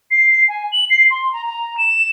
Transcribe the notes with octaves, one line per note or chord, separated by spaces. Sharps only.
C7
C7
G#5
F#7
C7
C6
A#5
A#5
E7